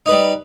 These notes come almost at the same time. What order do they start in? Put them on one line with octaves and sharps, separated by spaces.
D#4 B4 G3